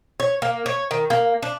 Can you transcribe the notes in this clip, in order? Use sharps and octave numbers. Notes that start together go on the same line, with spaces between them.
C#5
A#3
C#5
D#3
A#3
D4